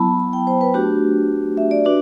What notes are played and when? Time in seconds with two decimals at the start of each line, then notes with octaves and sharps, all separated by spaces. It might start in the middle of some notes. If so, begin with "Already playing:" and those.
Already playing: F#3 B3 E4 A5 B5
0.20 B5
0.33 G5
0.47 C5
0.61 B4
0.74 A3 D4 F#4 G4
1.57 E5
1.71 D5
1.85 D4 F#4 B4